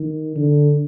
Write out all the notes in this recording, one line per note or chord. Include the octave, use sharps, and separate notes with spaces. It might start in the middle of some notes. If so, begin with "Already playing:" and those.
Already playing: D#3
D3